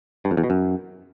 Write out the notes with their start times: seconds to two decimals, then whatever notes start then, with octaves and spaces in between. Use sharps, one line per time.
0.25 G2
0.31 F2
0.37 E2
0.44 B2
0.50 F#2